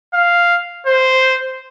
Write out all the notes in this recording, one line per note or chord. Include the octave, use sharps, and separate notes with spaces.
F5
C5